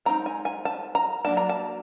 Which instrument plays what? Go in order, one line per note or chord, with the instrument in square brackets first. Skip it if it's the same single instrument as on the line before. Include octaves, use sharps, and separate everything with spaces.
[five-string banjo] G#3 C4 D#4 A#5
G#5
G#5
A5
A#5
F#3 A#3 D4 A5
A#5
A5